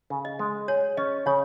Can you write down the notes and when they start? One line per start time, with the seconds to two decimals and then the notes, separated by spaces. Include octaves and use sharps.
0.10 C#3
0.25 D#5
0.39 G#3
0.68 G#4 C#5
0.97 C#4 D#5
1.26 C#3 C#5